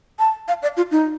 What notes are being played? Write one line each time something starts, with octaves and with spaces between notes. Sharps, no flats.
A5
F5
D5
F4
D#4